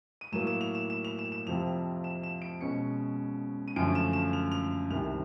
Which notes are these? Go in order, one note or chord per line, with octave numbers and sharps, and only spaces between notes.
D#7
A2 F#3 A#3 E7
E7
F7
E7
E7
F7
E7
E7
F2 C3 F3 F7
E7
E7
D7
B2 G#3 C#4 C#7
D#7
F#2 D3 F3 A3 C#4 D7
E7
E7
F7
F7
C2 C3 D#3 F7